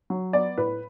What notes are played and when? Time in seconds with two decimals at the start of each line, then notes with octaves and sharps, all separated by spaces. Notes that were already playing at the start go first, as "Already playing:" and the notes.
0.10 F#3
0.33 B3 D5
0.57 A2 B4